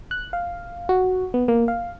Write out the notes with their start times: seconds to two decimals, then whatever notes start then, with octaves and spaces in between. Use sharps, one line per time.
0.11 F#6
0.33 F5
0.89 F#4
1.34 B3
1.48 A#3
1.68 F5